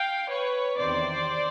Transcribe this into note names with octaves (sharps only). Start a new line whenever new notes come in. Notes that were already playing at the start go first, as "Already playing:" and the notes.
Already playing: F5 G5
B4 C#5
E2 C3 D#3 C5 D5